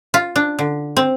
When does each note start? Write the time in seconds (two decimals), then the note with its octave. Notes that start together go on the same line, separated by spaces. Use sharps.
0.14 F4
0.36 D4
0.59 D3
0.97 C4